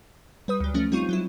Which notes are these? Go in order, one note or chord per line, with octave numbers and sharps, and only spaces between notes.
G3 B4 D#6
D2 F#3
F3 A3 C#4
G3 C4 D#4 F4 C#6 D#7
F#3 G#3 E4